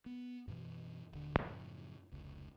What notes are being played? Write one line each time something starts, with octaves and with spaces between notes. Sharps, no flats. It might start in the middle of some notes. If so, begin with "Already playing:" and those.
B3
F#2 B2 E3
D#1 D3
F#2 A2 C#3 F3
F1 C#2